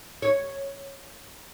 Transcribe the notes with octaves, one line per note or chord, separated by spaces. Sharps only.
C#5